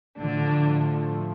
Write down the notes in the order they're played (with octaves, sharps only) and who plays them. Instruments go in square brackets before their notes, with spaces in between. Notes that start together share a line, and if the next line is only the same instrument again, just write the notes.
[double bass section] A2 F3 A3 [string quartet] D3 D4